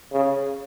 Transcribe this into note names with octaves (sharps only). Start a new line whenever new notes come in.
C#3